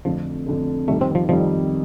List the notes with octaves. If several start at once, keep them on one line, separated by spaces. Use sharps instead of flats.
F2 D3 F3 A3
F2 D3 A3
F2 D#3 G3 A3
C4
F3
F2 D#3 F3 G3